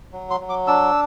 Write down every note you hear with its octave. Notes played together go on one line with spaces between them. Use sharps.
F#3
C6
F#3
D6
D4 E6